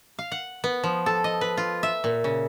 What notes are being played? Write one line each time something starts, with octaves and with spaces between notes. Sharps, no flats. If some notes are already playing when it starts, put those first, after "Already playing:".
F5
F#5
B3
F3
A4
D#5
B4
F4
E5
A#2
C#3